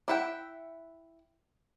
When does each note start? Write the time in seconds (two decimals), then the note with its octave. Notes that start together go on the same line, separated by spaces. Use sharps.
0.08 D4 E4 E5 F#5 G5